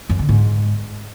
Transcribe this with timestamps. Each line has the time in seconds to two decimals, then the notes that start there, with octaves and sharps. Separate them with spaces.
0.09 F#2
0.19 D3
0.29 G#2